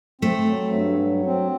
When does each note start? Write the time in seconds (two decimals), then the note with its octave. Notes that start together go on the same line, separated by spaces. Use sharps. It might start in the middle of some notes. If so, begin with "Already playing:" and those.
0.21 A3 C4
0.48 F#3
0.73 G2
1.00 F#3
1.26 C4